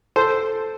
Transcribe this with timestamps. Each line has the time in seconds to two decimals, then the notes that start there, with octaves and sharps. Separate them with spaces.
0.16 A4 C5